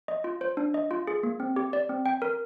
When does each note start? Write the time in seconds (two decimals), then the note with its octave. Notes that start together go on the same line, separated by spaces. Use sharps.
0.08 D#5
0.24 F4
0.41 C5
0.57 D4
0.74 D#5
0.91 F4
1.07 G#4
1.23 A#3
1.40 C4
1.56 G4
1.73 D5
1.89 C4
2.06 G5
2.22 A#4